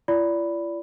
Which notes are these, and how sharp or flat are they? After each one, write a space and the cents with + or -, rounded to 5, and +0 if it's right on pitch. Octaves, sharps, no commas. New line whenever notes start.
F4 -45 D5 -20 B5 +0